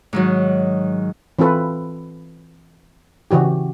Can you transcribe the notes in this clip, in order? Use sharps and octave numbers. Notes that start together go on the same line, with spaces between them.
G#2 D#3 F#3
E3 C4 F4 A4 B4
C#3 E3 F#4 G4